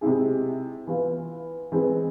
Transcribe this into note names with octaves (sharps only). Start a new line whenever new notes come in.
C3 G#3 C4 E4 G#4
E3 B3 F4
E3 G#3 C4